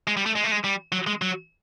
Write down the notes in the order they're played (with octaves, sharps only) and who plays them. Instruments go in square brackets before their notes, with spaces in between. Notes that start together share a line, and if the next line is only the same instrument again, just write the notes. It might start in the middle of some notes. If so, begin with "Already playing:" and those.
[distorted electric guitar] G#3
G3
A3
G#3
A3
G#3
G3
F#3
G#3
F#3